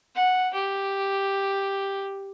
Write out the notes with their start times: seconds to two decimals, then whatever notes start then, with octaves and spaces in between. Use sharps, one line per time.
0.16 F#5
0.54 G4